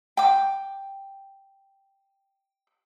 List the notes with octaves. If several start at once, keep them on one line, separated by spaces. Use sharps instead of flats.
G5 D6